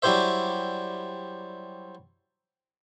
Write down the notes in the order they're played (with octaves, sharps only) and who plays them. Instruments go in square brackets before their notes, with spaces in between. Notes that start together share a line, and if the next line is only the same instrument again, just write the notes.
[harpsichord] F#3 G3 E4 G4 C5 E5